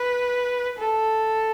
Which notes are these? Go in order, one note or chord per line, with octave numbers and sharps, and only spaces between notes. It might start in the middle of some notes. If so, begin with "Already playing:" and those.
Already playing: B4
A4